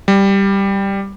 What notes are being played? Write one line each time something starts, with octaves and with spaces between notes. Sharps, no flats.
G3